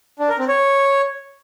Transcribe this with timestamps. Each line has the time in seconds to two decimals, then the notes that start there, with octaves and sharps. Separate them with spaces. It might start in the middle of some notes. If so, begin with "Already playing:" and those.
0.19 D4
0.29 A#4
0.39 C4
0.48 C#5